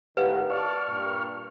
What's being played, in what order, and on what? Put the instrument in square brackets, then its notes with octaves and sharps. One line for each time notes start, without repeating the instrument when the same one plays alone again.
[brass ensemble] G#1 A2 D#3 [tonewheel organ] G4 F5 F#5 [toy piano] B4
[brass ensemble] D5 A5 [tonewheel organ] C#6 F6
[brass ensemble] G2 A#2